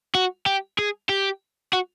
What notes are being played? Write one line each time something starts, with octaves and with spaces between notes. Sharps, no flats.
F#4
G4
G#4
G4
F#4